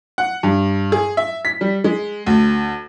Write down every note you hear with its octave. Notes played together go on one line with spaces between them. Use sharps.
F#5
G2
G#4
E5
B6
G3
G#3
D2